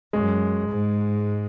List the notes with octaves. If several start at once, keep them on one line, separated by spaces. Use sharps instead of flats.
F#2 G#3
G#2